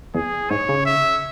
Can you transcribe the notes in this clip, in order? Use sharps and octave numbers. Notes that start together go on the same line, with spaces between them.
E2 G#4
G#2 C#5
C#3
E5